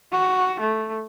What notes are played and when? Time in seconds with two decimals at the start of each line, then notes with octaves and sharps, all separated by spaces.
0.12 F#4
0.60 A3